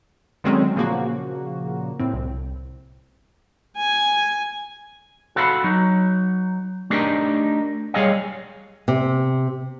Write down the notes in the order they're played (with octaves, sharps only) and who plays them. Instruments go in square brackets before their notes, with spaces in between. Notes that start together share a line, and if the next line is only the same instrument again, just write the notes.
[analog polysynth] D3 D#3 F#3 G#3 C4 C#4
A#2 C#3 F3 A#3 F#4
A2 C4
C2
[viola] G#5
[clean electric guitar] F#4 A4 F5 A#5 B5
F#3 D#4
A3 D4 D#4 G4 A#4
G3 G#4 C#5 D#5 F5
[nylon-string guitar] C3